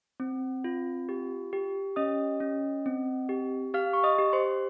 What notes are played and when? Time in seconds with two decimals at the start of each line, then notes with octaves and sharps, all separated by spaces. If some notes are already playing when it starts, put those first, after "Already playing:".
0.20 C4
0.64 F4
1.09 G4
1.53 G4
1.96 C#4 D#5 D#6
2.40 C#4
2.86 C4
3.29 G4
3.74 G4 F5 F6
3.93 C#6
4.04 D#5 D#6
4.18 G4
4.33 C5 C6